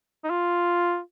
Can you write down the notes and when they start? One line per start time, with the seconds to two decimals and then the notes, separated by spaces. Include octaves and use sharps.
0.24 D#4
0.30 F4